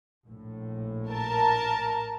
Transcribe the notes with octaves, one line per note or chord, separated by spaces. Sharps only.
A#1 A2
A#4 A5